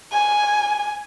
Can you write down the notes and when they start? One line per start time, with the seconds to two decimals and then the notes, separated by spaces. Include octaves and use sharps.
0.12 G#5